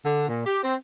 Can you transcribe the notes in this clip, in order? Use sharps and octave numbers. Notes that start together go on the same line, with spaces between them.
D3
A#2
G4
C4